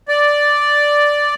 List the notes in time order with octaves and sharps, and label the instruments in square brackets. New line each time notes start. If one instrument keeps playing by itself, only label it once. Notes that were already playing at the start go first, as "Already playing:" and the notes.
[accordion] D5